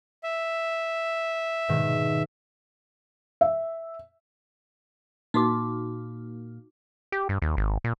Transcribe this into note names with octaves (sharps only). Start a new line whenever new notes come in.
E5
G#2 B2 D#3
E5
A#2 A#3 D#4 F#4 D6
G4
G2
D#2
G#1
A#2